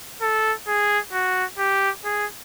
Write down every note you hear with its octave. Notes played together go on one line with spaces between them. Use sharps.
A4
G#4
F#4
G4
G#4